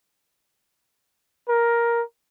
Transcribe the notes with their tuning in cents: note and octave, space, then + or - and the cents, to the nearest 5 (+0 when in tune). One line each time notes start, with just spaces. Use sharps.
A#4 +10